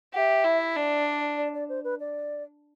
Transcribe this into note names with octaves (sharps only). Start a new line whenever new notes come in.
G4 E5 F#5
E4
D4 D5
D5
D5
C5
B4
D5